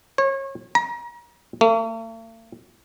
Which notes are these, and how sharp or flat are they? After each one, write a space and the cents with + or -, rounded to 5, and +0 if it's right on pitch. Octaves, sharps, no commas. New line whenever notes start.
C#5 -30
A#5 +35
A3 +45